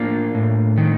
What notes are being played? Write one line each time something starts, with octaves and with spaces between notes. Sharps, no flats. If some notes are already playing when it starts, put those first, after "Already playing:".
Already playing: A2 A#3 D4 F4
A2
D#3